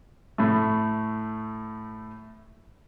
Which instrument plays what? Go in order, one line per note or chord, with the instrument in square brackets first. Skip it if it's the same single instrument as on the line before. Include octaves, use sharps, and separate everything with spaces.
[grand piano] A2 A3